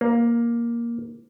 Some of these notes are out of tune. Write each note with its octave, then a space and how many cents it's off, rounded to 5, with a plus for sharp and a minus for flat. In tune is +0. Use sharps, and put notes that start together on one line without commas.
A#3 +10